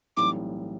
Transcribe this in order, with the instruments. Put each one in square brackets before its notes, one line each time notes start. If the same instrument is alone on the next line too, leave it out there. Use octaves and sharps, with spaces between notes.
[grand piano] B1 A2 E3 G3 C4 [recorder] D6